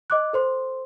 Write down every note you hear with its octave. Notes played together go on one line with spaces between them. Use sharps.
D#5 D6 F#6
A4 C5 C6